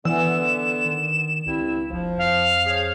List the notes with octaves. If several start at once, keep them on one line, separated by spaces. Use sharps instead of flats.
D3 E3 B3 E7
D#3
C#2 G2 C4 E4
F1 F3
F2 F5
G#4 C5 C#5